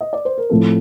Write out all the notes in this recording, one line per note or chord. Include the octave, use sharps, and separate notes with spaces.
D#5
D5
C5
A#4
A2 F3 A3 C4 A4